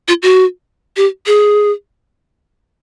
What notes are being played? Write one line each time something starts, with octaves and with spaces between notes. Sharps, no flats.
F4
F#4
G4
G#4